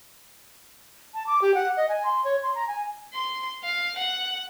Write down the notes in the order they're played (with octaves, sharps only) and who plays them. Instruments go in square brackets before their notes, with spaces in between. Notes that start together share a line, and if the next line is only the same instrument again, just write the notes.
[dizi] A5
D6
G4
F#5
D#5
G#5
C6
C#5
C6
A#5
G#5
[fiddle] C6
F5
F#5